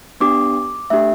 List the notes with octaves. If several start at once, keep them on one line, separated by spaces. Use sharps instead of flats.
B3 D4 G4 D6
A3 D4 G4 E5